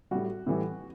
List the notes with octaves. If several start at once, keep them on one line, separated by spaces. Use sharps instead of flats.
A2 G3 F#4
A2 E3 G3